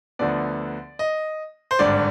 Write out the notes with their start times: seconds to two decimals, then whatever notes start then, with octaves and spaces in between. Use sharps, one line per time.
0.19 D2 D3 F3 B3 D5
0.99 D#5
1.71 C5
1.79 G#1 G2 D3 D5